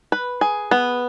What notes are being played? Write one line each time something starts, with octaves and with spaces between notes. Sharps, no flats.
B4
G#4
B3